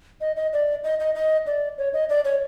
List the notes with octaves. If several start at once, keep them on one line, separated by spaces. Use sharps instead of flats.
D#5
D#5
D5
D#5
D#5
D#5
D5
C#5
D#5
D5
C#5